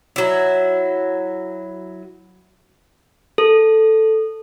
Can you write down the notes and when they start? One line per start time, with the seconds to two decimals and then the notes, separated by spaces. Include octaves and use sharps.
0.16 F#3 E4
3.38 A4